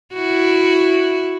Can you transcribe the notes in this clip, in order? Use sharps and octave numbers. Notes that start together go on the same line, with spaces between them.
E4 F#4